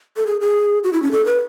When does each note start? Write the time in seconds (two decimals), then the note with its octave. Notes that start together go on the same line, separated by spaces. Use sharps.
0.17 A4
0.27 G#4
0.41 G#4
0.84 F#4
0.93 E4
1.03 C#4
1.12 A4
1.26 B4